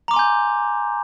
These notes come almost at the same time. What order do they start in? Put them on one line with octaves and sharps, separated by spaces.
A#5 D6 C6 G#5 G6